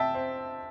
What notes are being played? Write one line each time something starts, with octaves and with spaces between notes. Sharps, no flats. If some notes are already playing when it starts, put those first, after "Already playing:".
Already playing: C3 E5 G5 A5
C4